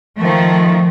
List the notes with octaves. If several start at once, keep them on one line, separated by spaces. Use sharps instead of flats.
D#3 F3 A3